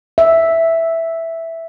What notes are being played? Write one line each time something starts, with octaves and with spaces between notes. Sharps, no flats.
E5